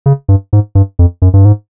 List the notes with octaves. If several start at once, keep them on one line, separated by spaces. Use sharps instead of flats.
C#3
G2
G#2
G2
F2
F#2
G2
G#2